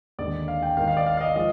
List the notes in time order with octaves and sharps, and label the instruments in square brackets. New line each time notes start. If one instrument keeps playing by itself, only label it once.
[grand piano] D#2 D3 G#3 D5
F5
G5
D#2 D#3 G#3 F5
F5
D5
F5
F5
D#5
F3 G#3 D#5